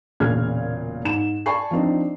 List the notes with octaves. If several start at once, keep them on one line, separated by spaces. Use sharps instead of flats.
E1 A#2 C#3 G#4 F6 G#6
G#2 E7
D5 G#5 A5 B5 C#6 C7
F3 C4 D4 D#4